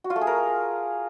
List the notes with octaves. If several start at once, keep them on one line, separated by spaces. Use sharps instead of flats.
F#4
F4
A3
G#4
A#4